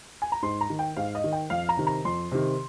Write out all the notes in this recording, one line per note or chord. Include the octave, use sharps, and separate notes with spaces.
G#5
A#5
G#2 C6
A#5
D#3
G5
G#2 F5
D#5
D#3
G5
F2 F5
A#5
C3 D#3
A#5
F2 C6
C3 D#3